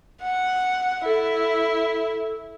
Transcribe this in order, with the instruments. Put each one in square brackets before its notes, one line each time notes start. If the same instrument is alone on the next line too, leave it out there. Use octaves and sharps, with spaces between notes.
[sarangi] F#5
[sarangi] E4 [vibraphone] A4